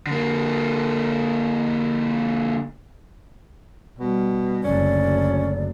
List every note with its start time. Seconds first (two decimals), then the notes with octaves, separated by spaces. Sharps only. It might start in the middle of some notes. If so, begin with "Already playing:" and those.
0.07 D3 A#3
3.99 B2 G3
4.64 F#1 D2 C#4 D5